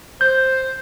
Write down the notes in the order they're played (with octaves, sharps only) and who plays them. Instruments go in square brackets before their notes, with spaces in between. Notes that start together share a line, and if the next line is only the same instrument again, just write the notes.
[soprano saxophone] C5 [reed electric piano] G6